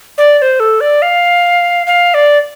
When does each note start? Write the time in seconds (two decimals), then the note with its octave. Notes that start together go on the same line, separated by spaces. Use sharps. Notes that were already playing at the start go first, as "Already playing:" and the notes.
0.18 D5
0.39 D5
0.42 C5
0.60 A4
0.81 D5
1.02 F5
1.87 F5
2.14 D5